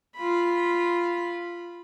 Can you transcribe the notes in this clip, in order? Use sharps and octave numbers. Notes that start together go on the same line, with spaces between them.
F4 B5